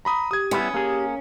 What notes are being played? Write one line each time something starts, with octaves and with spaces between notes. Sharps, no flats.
A#5 B5 D#6
G4 D#6 G#6
G3 B3 C#4 E4
A#3 G4 G#4